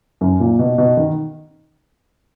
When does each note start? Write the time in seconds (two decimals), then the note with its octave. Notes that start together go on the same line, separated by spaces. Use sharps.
0.21 F#2
0.40 A#2
0.59 B2
0.78 B2
0.97 D#3